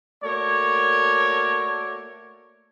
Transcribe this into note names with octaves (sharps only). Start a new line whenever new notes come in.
A3 A#3 F#4 A#4 C#5 D5